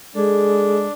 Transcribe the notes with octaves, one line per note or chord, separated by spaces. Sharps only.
G#3 D4 G#4 A4